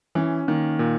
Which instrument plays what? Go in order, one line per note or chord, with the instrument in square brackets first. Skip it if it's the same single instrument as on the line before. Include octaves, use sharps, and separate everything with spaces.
[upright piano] E3 [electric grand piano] C#4
[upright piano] D#3 [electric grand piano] A#3
[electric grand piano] A#2